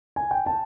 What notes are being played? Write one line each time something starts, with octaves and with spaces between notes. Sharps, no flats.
G#5
G5
A5